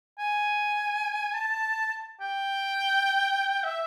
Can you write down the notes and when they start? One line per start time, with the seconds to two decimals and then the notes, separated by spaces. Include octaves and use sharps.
0.19 G#5
1.34 A5
2.21 G5
3.64 E5